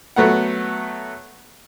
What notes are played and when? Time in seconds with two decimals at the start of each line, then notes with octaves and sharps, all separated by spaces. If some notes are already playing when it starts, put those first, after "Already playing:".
0.16 F#3 A3 B3 F#5